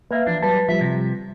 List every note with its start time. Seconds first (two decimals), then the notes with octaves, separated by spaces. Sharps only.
0.11 A#3 B4 E5 F5
0.27 E3 F3 D4
0.43 F#3 G3 B4 A5
0.69 F3 G3 E5
0.81 C3